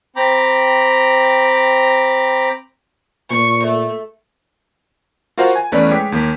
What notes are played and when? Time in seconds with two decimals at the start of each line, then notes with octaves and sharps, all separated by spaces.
0.16 C4 G5 A#5 B5 D6
3.31 A#2 C#6
3.64 A3
5.38 F4 F#4 A#4 C5 F5 F#5
5.56 G#5
5.72 E2 A3 C#4 B4 D5
5.91 G#3 C#5 G5 D6 B6
6.12 D#2 A#3